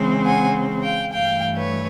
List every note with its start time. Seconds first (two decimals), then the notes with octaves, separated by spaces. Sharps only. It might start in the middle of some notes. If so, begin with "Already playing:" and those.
Already playing: C#3 E3 G#3 C4
0.26 F#5 G#5
0.84 F5 G5
1.13 G2 E3 A3 F5 G5
1.57 B4 C#5